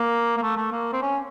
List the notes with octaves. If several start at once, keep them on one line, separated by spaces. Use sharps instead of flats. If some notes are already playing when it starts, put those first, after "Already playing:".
Already playing: A#3
A#3
A3
A3
A#3
C4
C#4